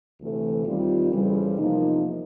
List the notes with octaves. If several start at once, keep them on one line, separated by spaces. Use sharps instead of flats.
D2 C3 E3 A3
D#2 D#3 G3 C4 F4
F2 C#3 E3 G3
E2 C3 F3 A#3 D#4